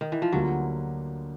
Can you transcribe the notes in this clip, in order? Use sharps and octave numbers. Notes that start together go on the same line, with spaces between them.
D#3
E3
F3
D2 D3 F#3 G3 A#3